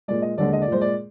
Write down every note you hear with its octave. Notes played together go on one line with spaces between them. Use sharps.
A#2 G#3 D5
D#5
D#2 D3 G#3 D5
D#5
D5
A#2 G#3 C5
D5